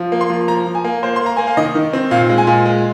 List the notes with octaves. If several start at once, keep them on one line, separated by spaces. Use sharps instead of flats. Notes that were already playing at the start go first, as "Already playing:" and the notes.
Already playing: F3
A#3
C6
F3
F3 A#5
F3
G#5
A#3
A#3 C5
A#3 C6
A#5
A#3 G#5
F5
D#3 D#5
D#3
C4
A#2 F5
G#3
G#5
A#2
G#3